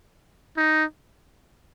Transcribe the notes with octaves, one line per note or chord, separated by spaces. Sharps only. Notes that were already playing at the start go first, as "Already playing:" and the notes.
D#4